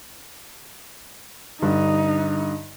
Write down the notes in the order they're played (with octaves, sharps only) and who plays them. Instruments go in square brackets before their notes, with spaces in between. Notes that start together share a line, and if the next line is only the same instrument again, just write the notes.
[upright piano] G2 D3 [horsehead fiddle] D#4